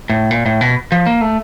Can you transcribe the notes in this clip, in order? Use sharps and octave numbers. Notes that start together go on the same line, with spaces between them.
A2
A#2
A2
B2
F3
A#3
A3